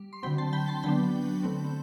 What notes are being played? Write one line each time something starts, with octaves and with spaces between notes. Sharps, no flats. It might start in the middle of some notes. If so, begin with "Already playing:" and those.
Already playing: G3
C6
D3 F#3 C4 G5 B5
A5 C6
G5 B5
A5 C6
D3 F#3 B3 D4 G5 B5
D3 A3 C4